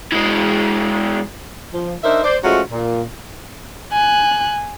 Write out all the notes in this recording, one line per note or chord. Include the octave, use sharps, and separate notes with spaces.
E3 G#3
F3
D4 D#4 A#4 C5 E5
C5 D5
F3 G#3 A3 C#4 F4 F#4
A#2
G#5 F#6